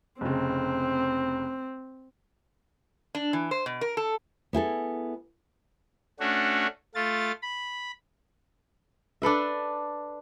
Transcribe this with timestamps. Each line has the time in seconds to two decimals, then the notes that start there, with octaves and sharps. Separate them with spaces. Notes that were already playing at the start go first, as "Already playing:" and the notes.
0.21 F1 C#3 C4
3.15 D4
3.33 E3
3.51 C5
3.66 B2
3.81 A#4
3.97 A4
4.53 B3 E4 G#4 A4
6.20 A3 C#4 D4 F#4
6.95 A3 F4 A6
7.42 B5
9.22 D4 A4 B4 E5